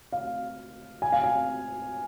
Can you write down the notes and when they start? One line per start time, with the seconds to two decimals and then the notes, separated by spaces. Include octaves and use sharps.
0.12 F5
1.02 G#5
1.12 F5
1.24 G#5